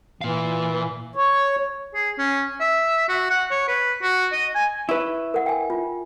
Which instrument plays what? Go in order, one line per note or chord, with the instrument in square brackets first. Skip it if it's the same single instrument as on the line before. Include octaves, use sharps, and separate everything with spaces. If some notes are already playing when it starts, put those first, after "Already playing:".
[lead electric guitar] A#2 F5 [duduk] E3
[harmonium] C#5
[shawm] G#4
C#4
E5
F#4
F#5
C#5
B4
F#4
D#5
G#5
[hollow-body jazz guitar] E4 B4 [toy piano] C#6
[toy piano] A#4 F#5
G5 G#5
F4